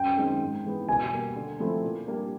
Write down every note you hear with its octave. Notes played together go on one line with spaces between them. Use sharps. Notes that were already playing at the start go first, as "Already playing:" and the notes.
Already playing: F#2 G5
D#3 G#3 C4 D#4
G#2
E3 G#3 B3
B2 G#5
G3 A#3
D3
F3 A3 C4 E4
A#2
G3 A#3 D4